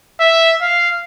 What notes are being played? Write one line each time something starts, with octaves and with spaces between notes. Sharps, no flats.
E5
F5